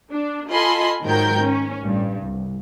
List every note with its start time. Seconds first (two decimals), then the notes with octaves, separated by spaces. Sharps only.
0.11 D4
0.50 F4 A4 D#5 G#5 B5 C6
1.03 G#2 D#3 F#3 A#4 G5 G6
1.40 C#4
1.81 A1 G2
2.22 C2